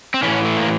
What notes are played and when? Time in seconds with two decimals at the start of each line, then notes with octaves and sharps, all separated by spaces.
0.14 C4
0.23 A2 E3 C#4
0.45 A3
0.57 A#3